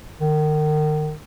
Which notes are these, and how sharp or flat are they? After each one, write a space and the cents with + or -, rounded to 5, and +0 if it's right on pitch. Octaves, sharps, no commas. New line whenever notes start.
D#3 -30